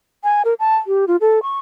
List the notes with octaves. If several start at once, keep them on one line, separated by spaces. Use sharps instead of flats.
G#5
A#4
A5
G4
F4
A4
C#6